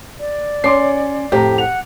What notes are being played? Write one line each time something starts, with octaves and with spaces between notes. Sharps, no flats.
D5
C#4 C6 D6 C7
F2 A2 G4 A#5
F#5 F7